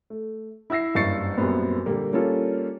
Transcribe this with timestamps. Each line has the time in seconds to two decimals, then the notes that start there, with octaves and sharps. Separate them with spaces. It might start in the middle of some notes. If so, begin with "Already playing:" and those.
0.10 A3
0.70 E4 E5 E6 A#6 C7
0.95 F#1 G2 C#6 A6 C7 C#7
1.37 F#2 A#2 G3 B3 C4
1.86 A#2 D3 G3 A#3
2.13 G3 A#3 C#4 F4 A4